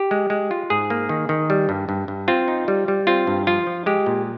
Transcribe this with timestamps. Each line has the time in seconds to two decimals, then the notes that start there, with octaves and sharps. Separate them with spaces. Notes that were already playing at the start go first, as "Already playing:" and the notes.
Already playing: G4
0.11 G#3
0.30 G#3
0.51 F4
0.70 G#2 G#4
0.90 A#3
1.09 D#3
1.29 D#3
1.50 G3
1.69 G2
1.89 G2
2.08 G2
2.28 C4 F4
2.48 D#4
2.68 G3
2.88 G3
3.07 C4 F4
3.27 G2
3.47 F3 F4
3.67 F3
3.86 G#3 G4
4.06 A#2